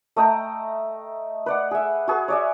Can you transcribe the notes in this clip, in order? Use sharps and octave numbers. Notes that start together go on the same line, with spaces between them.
A3 D#5 G5 A#5
B4 D5 F#5
G#4 E5
F#4 G#4 B4
C#5 D5 E5